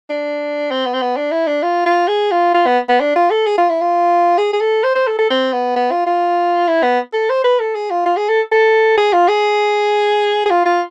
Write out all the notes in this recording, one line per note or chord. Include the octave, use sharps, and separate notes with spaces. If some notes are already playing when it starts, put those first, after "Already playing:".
D4
C4
B3
C4
B3
D4
E4
D4
F4
F4
G#4
F4
F4
B3
B3
D4
F4
A4
G#4
F4
E4
F4
G#4
G#4
A4
C5
C5
A4
A4
C4
B3
B3
F4
F4
E4
B3
A4
C5
B4
A4
G#4
F4
F4
G#4
A4
A4
G#4
F4
G#4
G#4
F4
F4